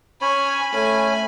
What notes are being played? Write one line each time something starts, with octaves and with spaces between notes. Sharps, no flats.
C#4 C#5 G#5 B5
A3 C#4 G#5